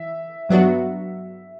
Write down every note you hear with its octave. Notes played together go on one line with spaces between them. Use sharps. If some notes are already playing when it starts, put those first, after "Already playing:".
Already playing: E3 E5
G2 F#3 B3 D4 F#4